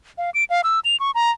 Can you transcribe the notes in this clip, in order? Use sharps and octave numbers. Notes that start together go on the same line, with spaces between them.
F5
D7
F5
E6
F7
C#6
A#5